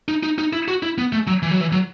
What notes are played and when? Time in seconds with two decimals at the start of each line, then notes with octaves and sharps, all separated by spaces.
0.08 D#4
0.23 D#4
0.38 D#4
0.53 E4
0.68 F#4
0.83 E4
0.98 B3
1.12 A3
1.27 F#3
1.43 E3
1.51 F#3
1.60 E3
1.72 F#3